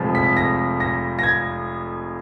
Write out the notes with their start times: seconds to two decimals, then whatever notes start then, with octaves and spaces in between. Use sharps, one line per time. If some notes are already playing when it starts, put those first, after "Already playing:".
Already playing: F1 F2 F3 G#3
0.15 B6
0.37 A#6
0.80 A#6
1.19 A#6
1.23 G#6